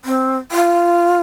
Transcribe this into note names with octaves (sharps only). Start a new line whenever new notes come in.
C4
F4